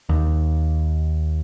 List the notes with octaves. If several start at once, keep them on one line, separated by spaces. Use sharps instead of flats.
D#2